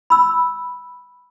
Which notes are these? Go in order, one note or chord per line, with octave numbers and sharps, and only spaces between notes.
B5 E6